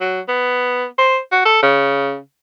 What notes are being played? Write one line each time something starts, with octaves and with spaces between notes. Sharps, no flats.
F#3
B3
C5
F#4
A4
C#3